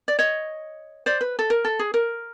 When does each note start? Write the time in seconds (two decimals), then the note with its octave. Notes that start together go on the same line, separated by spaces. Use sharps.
0.08 D5
0.19 C#5 D#5
1.06 C5 D5
1.21 B4
1.39 A4
1.50 A#4
1.65 A4
1.79 G#4
1.94 A#4